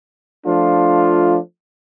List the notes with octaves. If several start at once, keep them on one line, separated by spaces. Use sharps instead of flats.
F3 A3 D4 F4